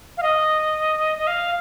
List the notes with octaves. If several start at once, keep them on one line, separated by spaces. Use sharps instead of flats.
F5
D#5
D#5
F5